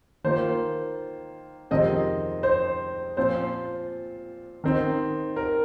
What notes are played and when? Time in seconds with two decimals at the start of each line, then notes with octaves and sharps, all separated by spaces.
0.24 D#3 A#3 F4 C5
1.71 F2 C3 D#3 G#3 C4 D#5
2.43 C5
3.17 A#2 F3 C4 F4 C5
4.64 D#3 C4 D#4
5.36 A#4